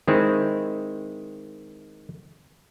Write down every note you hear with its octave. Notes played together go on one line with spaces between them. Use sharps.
D#3 G#3 C4 E4